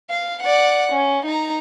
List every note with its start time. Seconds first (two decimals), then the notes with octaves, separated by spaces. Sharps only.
0.10 F5
0.43 D5 F#5
0.92 C#4
1.25 D#4 A#5